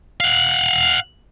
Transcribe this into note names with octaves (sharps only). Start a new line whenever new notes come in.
F5 F#5